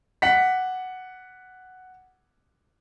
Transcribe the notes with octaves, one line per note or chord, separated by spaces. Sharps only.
F#5 B6